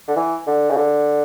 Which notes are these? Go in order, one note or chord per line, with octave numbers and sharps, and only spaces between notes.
D3
E3
D3
C#3
D3